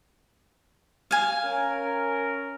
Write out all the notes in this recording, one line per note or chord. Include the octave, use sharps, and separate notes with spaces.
F5 G#5
C#4 A#4